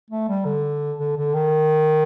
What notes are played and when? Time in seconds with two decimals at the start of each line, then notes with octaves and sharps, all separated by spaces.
0.11 A3
0.29 G3
0.45 D3
0.98 D3
1.17 D3
1.34 D#3